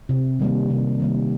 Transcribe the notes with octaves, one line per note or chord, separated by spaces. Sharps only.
C3
D#3 G3 A#3
C3
D#3 G3 A#3